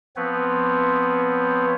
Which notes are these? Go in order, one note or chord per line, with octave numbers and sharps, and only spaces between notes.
F3 B3 C4 B4 C#5